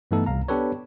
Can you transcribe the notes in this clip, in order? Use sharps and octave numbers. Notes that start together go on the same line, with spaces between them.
G2 E3 A3 B3 D#4 A4
C2 F5 A#5
B3 D4 G4 A4 B4 C#5